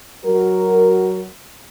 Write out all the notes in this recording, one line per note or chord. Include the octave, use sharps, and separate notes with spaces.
F#3 F#4 A#4